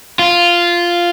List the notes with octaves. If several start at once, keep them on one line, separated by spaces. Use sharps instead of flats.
F4